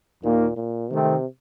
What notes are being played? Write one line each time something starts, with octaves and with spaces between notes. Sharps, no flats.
D#2 A#2 D#3 A#3
A#2
C3 D#3 A3 C4